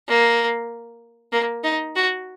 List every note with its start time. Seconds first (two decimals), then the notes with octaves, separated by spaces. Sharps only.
0.08 A#3
1.33 A#3
1.64 D#4
1.96 F#4